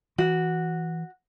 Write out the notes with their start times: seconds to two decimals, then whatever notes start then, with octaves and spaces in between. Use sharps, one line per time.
0.18 E3 F#4